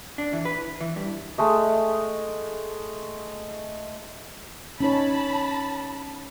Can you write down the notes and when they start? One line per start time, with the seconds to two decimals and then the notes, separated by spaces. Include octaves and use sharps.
0.18 D4
0.33 E3
0.45 B4
0.81 E3
0.96 G2
1.38 G#3 A3 D#5
4.80 C#4 D#4 C#5 A5 B5